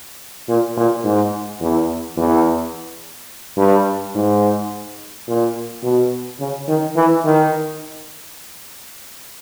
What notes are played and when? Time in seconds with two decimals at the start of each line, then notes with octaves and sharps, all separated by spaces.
0.49 A#2
0.77 A#2
1.04 G#2
1.60 E2
2.17 E2
3.58 G2
4.15 G#2
5.28 A#2
5.83 B2
6.40 C#3
6.68 D#3
6.96 E3
7.25 D#3